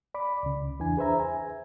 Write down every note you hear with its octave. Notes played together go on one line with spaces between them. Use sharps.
D5 B5 D6
C#2 C#3
E2 E3 D4 G#5
G#4 B4 C5 E5 A#5
G#5